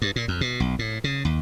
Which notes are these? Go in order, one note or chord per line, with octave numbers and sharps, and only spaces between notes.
G2
A#2
F2
B2
B1
A2
C#3
D#2